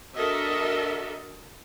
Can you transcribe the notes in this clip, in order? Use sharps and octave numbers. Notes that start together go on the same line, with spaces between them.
D4 F#4 A4 A#4 D#5 E5